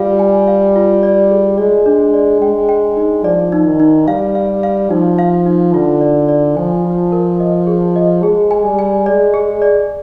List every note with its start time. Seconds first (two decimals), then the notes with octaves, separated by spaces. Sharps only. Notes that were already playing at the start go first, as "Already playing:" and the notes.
Already playing: G3 F4 F5
0.19 G#5
0.48 F5
0.76 F4
1.03 D5
1.30 G#4
1.58 G#3 D5
1.86 D4
2.14 D5
2.41 G#3 G5
2.69 G5
2.97 D#4
3.24 F3 D5
3.52 D#4
3.66 D#3
3.80 D#4
4.07 G3 F5
4.35 F5
4.63 F5
4.90 F3 D#4
5.19 F5
5.46 D#4
5.74 D3 F4
6.01 D5
6.29 D5
6.57 F3 G#5
6.85 F4
7.12 A#4
7.40 D#5
7.67 G#4
7.96 D#5
8.23 G#3 G#4
8.51 G#5
8.64 G3
8.79 G#5
9.06 G#3 D5
9.34 G#4
9.62 D5